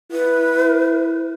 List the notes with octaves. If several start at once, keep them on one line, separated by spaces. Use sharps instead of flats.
E4 B4